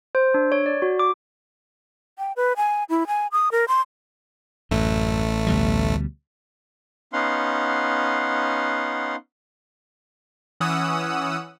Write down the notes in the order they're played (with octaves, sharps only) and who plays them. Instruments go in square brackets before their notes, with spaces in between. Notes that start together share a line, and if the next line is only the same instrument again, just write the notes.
[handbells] C5
D4
C#5
D5
F#4
D6
[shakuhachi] G5
B4
G#5
E4
G#5
D#6
A#4
C6
[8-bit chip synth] A1 A3 [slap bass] F#2
[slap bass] D2 B2 G3
[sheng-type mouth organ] B3 C#4 D#4 F5 F#5 C6
[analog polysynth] E3 C#4 F#5 D#6 E6